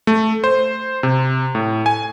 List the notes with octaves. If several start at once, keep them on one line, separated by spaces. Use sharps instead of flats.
A3
C5
C3
A2
G#5